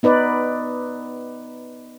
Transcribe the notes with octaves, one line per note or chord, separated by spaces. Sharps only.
B3 D#4 B4 D5